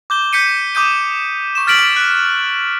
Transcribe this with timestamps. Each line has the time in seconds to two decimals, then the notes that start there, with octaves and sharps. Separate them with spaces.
0.10 D6 G6 G7
0.33 G6 B6 C#7 D#7
0.75 D6 D#6 G6 D#7
1.55 C#6 E7
1.67 F6 A6 B6 D7 F#7
1.96 F#6